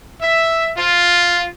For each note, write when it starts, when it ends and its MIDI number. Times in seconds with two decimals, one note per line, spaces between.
0.21 0.70 76
0.77 1.45 65